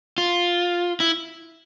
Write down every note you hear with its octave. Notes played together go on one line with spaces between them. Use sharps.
F4
E4